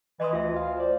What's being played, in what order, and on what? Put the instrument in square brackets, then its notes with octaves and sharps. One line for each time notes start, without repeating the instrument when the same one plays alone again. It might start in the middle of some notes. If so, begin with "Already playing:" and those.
[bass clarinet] E3 [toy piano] D#5 C6 D#6
[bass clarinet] D2 [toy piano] F4 E5
[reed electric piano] F5
C5 D5